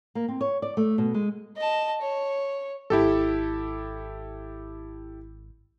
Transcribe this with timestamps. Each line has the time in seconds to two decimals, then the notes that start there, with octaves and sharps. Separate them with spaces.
0.15 A#3
0.28 C4
0.41 C#5
0.62 D5
0.77 A3
0.98 B2
1.14 G#3
1.57 D#5 A5
2.01 C#5
2.90 G#1 E4 G4 A4